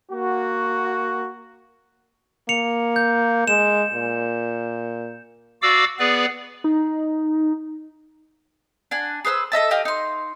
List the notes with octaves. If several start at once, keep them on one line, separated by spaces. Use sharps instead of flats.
A#3 F#4
A#3 C#7 F7
G6
G#3 E7
A#2
F#4 D5 F5 D6 E6
B3 G#4 B4 D5
D#4
D4 F#5 G#5
G#4 B4 C5 E6
A4 D#5 E5 A5
G4 D#5 F5
D#4 C6